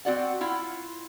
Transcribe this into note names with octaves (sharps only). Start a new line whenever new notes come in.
C4 F#4 D5 F#5
E4 F4 F#5